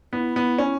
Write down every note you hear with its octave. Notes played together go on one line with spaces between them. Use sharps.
B3 E4
B3
C#4